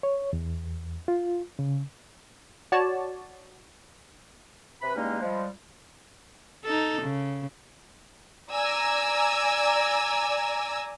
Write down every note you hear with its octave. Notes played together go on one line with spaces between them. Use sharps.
C#5
E2
F4
C#3
F#4 C#5 D5 A5
C3 B4 B5
E2 G3 G#3 A#3 C#4 D#4
F3 G3 G#3
D#4 A4
C#3
D5 G#5 A#5 E6